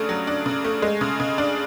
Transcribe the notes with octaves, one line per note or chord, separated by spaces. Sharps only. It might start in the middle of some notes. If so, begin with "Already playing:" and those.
Already playing: C#3 A3 D4
F#3
D4
C#3
A3
G#3
C#3
C#3
D4